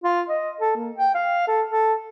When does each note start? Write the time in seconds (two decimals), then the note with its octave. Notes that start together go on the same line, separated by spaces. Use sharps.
0.04 F4
0.29 D#5
0.60 A4
0.76 A#3
0.96 G5
1.14 F5
1.47 A4
1.71 A4